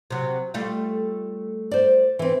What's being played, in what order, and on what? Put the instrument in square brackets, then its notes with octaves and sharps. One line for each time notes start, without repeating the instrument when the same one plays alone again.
[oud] C3 F#3
G3 A3 F4
[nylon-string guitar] C5 D5
E3 C4